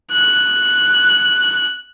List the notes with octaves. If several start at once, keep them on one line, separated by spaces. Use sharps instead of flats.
F#6